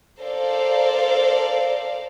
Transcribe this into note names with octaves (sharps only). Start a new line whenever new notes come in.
A4 A#4 C5 D5 F5